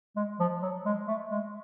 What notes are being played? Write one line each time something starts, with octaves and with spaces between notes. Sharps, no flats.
G#3
F3
F#3
G#3
A3
G#3